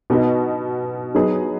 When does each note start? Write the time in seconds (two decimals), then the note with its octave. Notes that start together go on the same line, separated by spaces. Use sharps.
0.10 B2 B3 D#4 F#4
1.15 F#3 B3 D#4 G#4